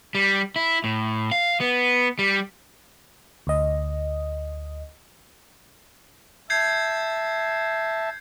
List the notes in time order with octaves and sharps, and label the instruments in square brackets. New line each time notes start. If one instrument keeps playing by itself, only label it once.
[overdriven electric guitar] G3
E4
A2
F5
B3
G3
[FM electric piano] D2 D#5
[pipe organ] E5 A5 [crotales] G6 G#6 C7